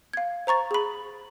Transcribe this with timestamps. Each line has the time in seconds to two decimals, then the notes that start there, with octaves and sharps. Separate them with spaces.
0.13 F5 G#6
0.47 C5 A#5 C#6 A6
0.71 G#4 B5